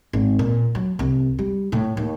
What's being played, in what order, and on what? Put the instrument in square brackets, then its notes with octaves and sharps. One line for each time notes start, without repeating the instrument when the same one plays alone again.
[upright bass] G#1
A#2
F#3
C2
G3
A2
D#2